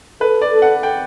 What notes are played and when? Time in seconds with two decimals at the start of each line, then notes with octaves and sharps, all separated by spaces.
0.21 A4 B4
0.42 D5
0.52 A4
0.62 F#5
0.83 G5